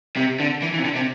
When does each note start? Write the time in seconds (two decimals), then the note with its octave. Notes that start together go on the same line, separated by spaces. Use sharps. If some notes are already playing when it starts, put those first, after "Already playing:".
0.16 C3
0.40 D3
0.62 E3
0.74 E3
0.79 C3
0.84 D3
0.95 C3